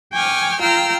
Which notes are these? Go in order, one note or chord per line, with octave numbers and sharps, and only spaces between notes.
G5 G#5 C#6 D6 F6
F4 G5 A#5 E6 F6